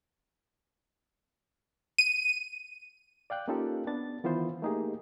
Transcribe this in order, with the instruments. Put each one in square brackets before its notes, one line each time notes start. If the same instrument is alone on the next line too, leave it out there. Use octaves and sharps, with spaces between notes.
[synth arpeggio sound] D#7
[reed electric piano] D5 F5 G5 F#6
A#3 C#4 D#4 F4 G4 A4
B3 D4 A6
D#3 E3 B3 E4 F4 C5
A3 A#3 D#4 G4 G#4